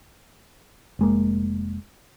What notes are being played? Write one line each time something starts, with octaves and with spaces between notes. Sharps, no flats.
F1 G#3 A#3